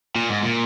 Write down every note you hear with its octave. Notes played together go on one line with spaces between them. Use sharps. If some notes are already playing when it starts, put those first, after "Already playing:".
A#2
G#2
A#2